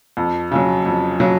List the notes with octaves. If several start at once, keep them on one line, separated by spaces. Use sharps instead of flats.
F2
C#3 F#3
F2
C#3 F#3